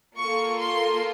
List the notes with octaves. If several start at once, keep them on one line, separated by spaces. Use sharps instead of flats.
A#3 F4 A4 C#6
C6